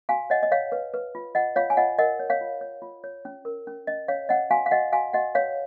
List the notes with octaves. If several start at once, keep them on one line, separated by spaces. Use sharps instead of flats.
F#4 F5 G#5
C#5 D#5 F#5
D#5
C#5 F5
B4
B4
F4
F4 D#5 F#5
F4 C#5 F5
G#5
F4 D#5 F#5
A#4 D#5 F#5
C#5
C#5 F5
F4
C#5
F4
C#5
C#4
A#4
C#4
C#4 D#5
C#4 C#5 F5
C#4 D#5 F#5
F#4 F5 G#5
F5
F#4 D#5 F#5
F#4 F5 G#5
F#4 D#5 F#5
B4 C#5 F5